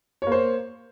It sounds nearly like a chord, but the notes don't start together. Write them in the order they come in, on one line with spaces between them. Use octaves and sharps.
C#5 A#3 C5